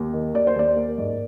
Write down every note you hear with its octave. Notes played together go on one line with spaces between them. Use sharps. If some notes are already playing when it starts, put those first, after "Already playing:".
Already playing: D#2
D#3
D#2 D5
C5
D#2 D5
A#3
G#2